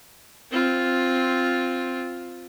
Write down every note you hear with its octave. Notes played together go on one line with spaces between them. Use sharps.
C4 F4